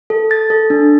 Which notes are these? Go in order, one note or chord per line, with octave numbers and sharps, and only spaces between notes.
A4
A4 A6
A4
D4